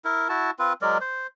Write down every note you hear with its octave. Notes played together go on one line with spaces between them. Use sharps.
E4 A#4
E4 F#4 A5
C4 F4 B4
F#3 G#3 A#4 D5
C5